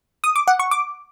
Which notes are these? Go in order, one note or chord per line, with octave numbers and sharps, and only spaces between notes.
D#6
D6
F#5
C#6
D6